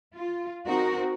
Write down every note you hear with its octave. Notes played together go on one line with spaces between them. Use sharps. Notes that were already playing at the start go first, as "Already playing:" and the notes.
F4
C4 D#4 F#4 A#4